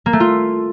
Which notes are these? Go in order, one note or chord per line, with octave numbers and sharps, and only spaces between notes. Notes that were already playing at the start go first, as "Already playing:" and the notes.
A#3
A3
F4